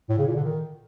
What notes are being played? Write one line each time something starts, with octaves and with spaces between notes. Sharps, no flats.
A2
C#3
A#2
D3
D#3